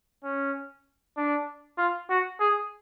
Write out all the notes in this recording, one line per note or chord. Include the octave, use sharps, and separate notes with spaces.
C#4
D4
F4
F#4
G#4